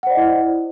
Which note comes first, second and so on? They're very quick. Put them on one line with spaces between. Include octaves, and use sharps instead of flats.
F#5 C5 D5 D#5 E4